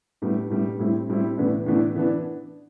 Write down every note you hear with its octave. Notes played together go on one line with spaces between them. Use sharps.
A2 G3 B3
A2 G3 B3
A2 G3 C4 E4
A2 G3 C4 E4
A2 E3 B3 D4
A2 E3 B3 D4
E3 B3 D4